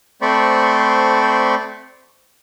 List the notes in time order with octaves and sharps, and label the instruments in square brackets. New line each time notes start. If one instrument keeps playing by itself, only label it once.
[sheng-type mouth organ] A3 C4 C5 D5 B5 C#6